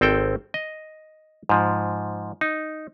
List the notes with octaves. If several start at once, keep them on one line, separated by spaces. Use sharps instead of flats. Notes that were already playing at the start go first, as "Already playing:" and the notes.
G#1 C4 A4 G5
D#5
G#2 F3
D#4